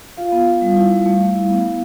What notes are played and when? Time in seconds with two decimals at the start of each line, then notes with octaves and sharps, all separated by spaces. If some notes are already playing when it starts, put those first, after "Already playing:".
0.17 F4 F5
0.32 B3
0.47 F4
0.62 G3
0.77 E4
0.91 G3
1.06 A3
1.20 A3
1.35 E4
1.49 B3
1.64 B3